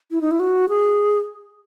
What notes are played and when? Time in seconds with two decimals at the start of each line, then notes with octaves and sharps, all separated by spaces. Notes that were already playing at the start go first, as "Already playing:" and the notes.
0.11 E4
0.21 D#4
0.31 E4
0.40 F#4
0.69 G#4